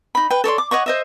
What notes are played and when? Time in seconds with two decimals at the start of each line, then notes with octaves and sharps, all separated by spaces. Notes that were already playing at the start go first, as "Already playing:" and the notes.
0.15 D#4 B5
0.30 B4 G5
0.44 A4 C#5 D5 C6
0.58 D6
0.71 C#5 D#5 F#5 C#6
0.86 C5 D#5 E5